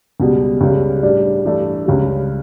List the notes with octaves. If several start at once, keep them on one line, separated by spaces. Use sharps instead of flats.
C#2 B2 G3
C#2 C#3 G3
A2 G3 D4
G2 E3 A3 D4
C#2 C#3 G3